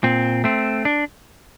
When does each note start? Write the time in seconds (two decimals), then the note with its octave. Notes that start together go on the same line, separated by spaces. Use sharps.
0.04 A#2 C4
0.44 A3 C4
0.85 D4